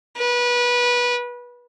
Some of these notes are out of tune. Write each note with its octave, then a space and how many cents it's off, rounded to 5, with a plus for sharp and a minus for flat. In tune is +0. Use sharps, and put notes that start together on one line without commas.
B4 -25